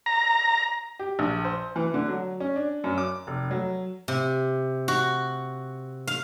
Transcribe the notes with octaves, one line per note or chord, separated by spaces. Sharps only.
A#5
G4
A#1
C5
E3
D3
F#3
C#4
D4
F#2
D6
F1
F#3
C3
F#4
F5